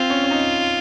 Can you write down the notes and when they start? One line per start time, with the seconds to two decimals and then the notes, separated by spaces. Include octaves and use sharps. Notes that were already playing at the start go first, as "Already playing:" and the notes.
Already playing: C4 F4
0.10 C#4
0.24 C#4
0.31 D#4